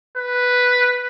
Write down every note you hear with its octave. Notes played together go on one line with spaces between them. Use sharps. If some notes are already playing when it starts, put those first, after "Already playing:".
B4